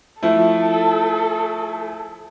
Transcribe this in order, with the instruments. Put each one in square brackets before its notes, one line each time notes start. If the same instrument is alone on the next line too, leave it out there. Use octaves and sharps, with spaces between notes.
[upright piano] F3 A3 E4 [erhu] A4